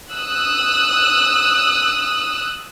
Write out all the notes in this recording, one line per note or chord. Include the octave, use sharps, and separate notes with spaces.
D#6 E6 F#6